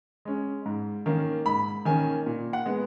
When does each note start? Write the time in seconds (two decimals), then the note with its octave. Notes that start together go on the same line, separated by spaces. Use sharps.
0.25 G#3 C#4
0.66 G#2
1.06 D#3 A#3 C#4
1.46 G#2 B5
1.85 D#3 A#3 C#4 G#5
2.26 A#2
2.53 F#5
2.66 G#3 B3